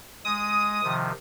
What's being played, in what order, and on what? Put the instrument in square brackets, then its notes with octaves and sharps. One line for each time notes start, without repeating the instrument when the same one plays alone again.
[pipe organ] G#3 [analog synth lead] D#6
[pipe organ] C3 D#3 F3